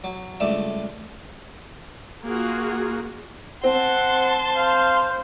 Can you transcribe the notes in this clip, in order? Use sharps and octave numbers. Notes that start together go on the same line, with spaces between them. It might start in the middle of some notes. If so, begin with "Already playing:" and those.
F#3
C#2 G2 G3 A3 E5 A5
A#3 F4 F#4 G#4
C4 F#5 A5 C6
C5 F5